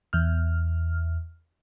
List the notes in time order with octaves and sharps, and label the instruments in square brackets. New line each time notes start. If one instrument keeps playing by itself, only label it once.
[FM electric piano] E2 F6